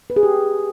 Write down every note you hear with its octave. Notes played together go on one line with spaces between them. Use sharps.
B4
G#4
G4